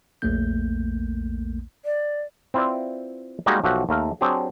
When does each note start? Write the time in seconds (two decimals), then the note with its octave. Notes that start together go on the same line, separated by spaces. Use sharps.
0.22 A#1 E2 A3 A#3 G6
1.85 D5
2.54 C4 E4 F4 B4 D5
3.46 G3 G#3 A#3 D#4 F#4 G4
3.64 B1 F3 F#4 G4 E5 F#5
3.89 D#2 A3 A#4 F5
4.21 F#3 C4 D4 G4 G#4